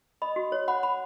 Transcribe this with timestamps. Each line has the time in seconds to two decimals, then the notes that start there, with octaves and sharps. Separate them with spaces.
0.22 D#5 B5
0.36 F#4
0.52 C#5
0.68 F#5 B5
0.83 B5